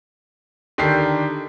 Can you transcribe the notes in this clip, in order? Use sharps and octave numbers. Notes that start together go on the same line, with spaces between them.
D3 D#3 D4 G4 C7